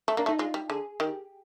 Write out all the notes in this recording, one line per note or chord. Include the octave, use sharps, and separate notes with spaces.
A3
A#3 D4
A3
D#4
G#3 F4
G3
D3 G#4
D#3 G4